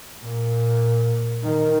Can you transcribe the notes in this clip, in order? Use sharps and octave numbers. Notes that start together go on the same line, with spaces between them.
A#2
D#3